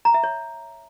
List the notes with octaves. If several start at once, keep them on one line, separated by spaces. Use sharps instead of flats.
A#5
E5
C#5